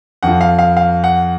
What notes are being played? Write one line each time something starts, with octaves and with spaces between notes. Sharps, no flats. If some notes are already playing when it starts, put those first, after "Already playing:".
F2 F3 F#5
F5
F5
F5
F#5